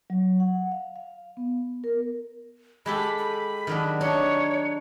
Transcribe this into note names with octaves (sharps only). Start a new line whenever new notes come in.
F#3
F#5
F5
F5
B3
A#4
G#3 G4 A4 B5
B5
D#3 F#3 D4
D4 D#4 C#5